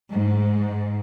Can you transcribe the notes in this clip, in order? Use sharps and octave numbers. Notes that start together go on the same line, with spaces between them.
G#2